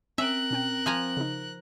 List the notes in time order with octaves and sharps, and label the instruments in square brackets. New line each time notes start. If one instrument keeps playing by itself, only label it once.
[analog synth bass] C4 [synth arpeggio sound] C#4 D7 [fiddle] A#4 F#6 [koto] E5
[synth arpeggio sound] B2 C#4 G5
[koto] F3 G#5 A#5
[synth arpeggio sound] C#3 D#4